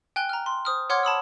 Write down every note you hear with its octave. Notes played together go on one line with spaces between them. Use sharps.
G5 G#5 F#6 G7
A#5 F6
C6
C5 D#6 F6
C#5 F#5 C6 D6 F6 G#6
A5 B5 D#6 E6